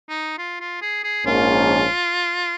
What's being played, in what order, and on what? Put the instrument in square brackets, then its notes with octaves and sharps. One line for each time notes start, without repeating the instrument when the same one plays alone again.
[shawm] D#4
F4
F4
G#4
G#4
[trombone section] A#1 G#2 F3 A#3 C#4 [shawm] F4